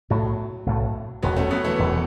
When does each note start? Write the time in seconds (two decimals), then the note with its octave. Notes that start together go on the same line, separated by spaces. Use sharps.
0.10 B1 A2 F#3 A3
0.66 B1 A2 A3
1.22 E1 E2 B2 F#3 B3
1.36 A3 C#4
1.51 F#3 B3
1.64 E3 A3
1.79 E1 E2 B2